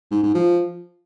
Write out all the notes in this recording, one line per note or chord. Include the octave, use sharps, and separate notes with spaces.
G#2
G#2
F3